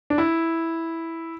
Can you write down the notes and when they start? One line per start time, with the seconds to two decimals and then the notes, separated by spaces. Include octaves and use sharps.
0.10 D4
0.18 E4